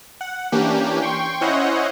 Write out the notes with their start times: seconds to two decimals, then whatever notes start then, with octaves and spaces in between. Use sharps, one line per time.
0.21 F#5
0.52 E3 A#3 C#4 D4 G4
1.02 G5 C6 C#6
1.41 C#4 E4 C5 C#5 D#5 F#5